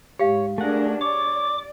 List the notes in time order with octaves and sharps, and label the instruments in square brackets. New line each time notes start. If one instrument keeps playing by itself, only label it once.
[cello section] G#2 [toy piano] G4 F5 [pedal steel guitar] C#5
[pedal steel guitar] A3 F#5 [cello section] D4 G#4 A#4
[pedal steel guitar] C#5 [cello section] D5 [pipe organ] D6